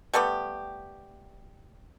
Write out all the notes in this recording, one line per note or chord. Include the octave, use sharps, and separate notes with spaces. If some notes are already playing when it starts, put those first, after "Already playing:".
G3 A3 B3 G4